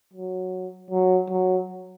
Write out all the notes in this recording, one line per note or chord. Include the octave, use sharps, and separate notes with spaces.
F#3
F#3
F#3